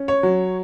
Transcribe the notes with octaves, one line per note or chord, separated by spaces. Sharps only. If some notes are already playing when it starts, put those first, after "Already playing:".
Already playing: C#4
C#5
F#3